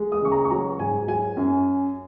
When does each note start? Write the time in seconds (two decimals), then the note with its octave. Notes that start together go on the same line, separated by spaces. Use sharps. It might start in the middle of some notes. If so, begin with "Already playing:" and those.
Already playing: G#3
0.12 D#6
0.22 C#3 C#6
0.32 A#5
0.45 C#6
0.50 F#3 A#5
0.79 G#2 G#5
1.08 F#3 G#5
1.37 F#2